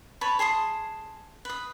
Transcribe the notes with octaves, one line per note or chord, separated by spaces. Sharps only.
B4 C#5 A5 B5
G#4 A5 C6 D#6
B4 D#6